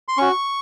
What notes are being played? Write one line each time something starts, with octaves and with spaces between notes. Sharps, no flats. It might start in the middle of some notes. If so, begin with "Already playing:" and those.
C6
C#4 F#4 C#6